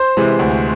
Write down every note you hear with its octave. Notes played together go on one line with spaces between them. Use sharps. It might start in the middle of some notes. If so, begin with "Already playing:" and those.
Already playing: C5 C6
C3 E3 G#3
D2